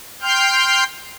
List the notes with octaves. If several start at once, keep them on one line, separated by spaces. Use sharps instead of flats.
G5 C6 F6 G6